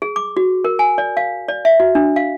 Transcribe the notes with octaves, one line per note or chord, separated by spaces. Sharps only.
G#4
D6
F#4
A#4
G#5
D5
F5
D5
E5
F#4
D4
F5